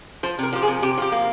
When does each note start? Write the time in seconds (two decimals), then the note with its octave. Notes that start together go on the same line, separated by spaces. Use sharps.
0.23 F3 C5
0.39 C3 A#4
0.53 F3 G4
0.63 G#4
0.68 C3
0.82 C3 G4
0.98 F3 G4
1.12 A#3